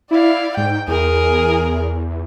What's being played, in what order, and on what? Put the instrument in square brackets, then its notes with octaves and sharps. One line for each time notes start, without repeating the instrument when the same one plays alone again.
[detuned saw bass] E4 [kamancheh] D5 F5
[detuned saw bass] G#2 [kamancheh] G5
[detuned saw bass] E2 [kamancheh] G#4 A#4